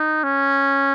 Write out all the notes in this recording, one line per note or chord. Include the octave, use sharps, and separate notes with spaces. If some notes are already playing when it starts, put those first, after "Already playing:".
Already playing: D#4
C#4